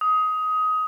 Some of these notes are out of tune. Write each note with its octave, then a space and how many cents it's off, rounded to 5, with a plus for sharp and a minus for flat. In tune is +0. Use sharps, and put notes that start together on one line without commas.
D#6 +20